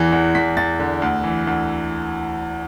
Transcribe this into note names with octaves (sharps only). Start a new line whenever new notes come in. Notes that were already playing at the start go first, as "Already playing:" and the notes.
Already playing: E2 E3
E2
E2 B6
E2 A6
D3
D2
E3
D2